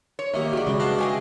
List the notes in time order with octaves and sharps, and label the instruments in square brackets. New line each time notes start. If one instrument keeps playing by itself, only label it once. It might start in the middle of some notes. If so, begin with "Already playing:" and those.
[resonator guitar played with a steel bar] C#5
[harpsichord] D#3 A#3 [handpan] G4 E5
[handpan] F#4 G#4 [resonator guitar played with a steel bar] D5 D#5
[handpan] C#3 G#3 [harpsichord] G3
[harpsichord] B3 F#4 F5 [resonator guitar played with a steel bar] D4
[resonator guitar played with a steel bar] G4 G#4 D#5 [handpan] E5